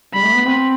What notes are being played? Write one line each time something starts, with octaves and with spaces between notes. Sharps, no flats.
G3 B5
A3
B3
C4